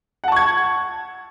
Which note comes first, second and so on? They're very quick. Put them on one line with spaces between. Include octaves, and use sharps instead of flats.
F#5 A5 C#6 G#6